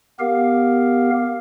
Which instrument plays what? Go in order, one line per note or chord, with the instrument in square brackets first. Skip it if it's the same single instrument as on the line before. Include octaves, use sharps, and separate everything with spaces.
[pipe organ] B3 G4 A#4 F5